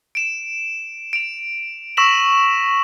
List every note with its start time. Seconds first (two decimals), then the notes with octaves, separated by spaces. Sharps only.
0.15 D7 E7
1.13 D7 F7
1.97 C#6 E6 A#6 B6 E7 F#7